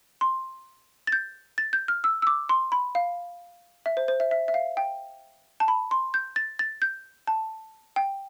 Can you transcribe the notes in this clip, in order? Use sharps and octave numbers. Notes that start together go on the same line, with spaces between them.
C6
A6
G6
A6
G6
F6
E6
E6
D6
C6
B5
F5
E5
C5
C5
E5
E5
E5
F5
G5
A5
B5
C6
G6
A6
A6
G6
A5
G5